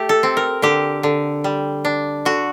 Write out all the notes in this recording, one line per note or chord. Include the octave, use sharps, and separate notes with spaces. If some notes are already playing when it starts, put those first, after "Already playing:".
Already playing: A3 G4
A4
C4
A#4
D3 G4
D3
G3
D4
D3 F#4